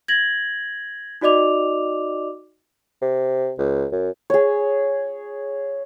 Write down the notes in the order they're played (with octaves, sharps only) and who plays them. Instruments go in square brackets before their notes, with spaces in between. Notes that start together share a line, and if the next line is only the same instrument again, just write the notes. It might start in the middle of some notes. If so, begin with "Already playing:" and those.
[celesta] G#6 A#6 F#7
D#4 F#4 D5 D#5 D6 F7
[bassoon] C3
C#2
F#2
[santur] G#4 C#5